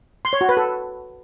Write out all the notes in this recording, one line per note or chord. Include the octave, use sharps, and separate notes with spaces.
C6
C#5
F#4
B4
A4